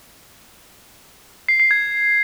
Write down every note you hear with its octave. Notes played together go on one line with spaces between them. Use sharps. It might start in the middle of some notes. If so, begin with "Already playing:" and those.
C7
C7
G#6